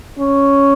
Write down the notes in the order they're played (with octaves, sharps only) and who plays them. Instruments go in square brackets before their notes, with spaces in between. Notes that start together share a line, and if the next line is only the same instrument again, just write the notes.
[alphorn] C#4